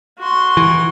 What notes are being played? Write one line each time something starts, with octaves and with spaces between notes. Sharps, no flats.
F#4 C6
E3